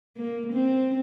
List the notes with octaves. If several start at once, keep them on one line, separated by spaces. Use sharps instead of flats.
A#3
C4